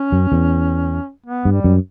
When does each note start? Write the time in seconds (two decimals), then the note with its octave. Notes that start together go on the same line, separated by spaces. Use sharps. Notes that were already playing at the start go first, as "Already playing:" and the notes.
Already playing: C#4
0.12 F#2
0.32 E2
1.26 B3
1.45 G2
1.51 G3
1.64 F#2